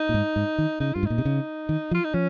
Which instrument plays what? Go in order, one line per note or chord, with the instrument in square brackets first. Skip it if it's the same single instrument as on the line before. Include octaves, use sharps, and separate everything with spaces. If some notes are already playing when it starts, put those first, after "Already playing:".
Already playing: [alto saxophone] D#4
[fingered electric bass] A#2
G#2
G#2
D#3
[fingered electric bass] C#3 [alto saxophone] D#4
[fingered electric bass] G2 [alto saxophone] F4
[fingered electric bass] G#2
[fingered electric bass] A#2 [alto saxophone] D#4
[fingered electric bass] C3
C#3
D#3
F3
[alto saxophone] F4
D#4
[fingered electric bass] F3 [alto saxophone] C#4